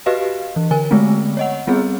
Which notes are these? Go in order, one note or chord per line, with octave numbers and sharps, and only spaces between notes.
F#4 G4 B4 D#5 F5
E3
D3 A#4 G#5
D3 G#3 A3 B3 C4
C#5 D#5 F#5
G3 B3 C4 G#4